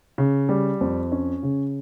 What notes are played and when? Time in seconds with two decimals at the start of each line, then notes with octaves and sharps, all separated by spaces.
0.18 C#3
0.49 G3
0.81 F2
1.12 C#4
1.43 C#3